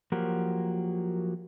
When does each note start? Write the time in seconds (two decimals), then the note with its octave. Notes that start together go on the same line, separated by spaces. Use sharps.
0.12 F3 F#3 A#3 F#4 G4 A#4